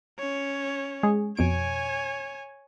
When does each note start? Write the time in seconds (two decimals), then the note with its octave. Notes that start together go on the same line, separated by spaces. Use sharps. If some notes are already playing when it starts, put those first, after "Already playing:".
0.19 C#4 C#5
1.03 G#3 G#4
1.37 F2 B2 C#5 G#5 D7